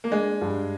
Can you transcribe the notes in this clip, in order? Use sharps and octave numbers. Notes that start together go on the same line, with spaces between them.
A#3
G#3 D4
G2